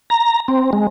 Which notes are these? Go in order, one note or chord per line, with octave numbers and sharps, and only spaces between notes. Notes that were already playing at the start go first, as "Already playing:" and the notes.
A#5
C4
G#3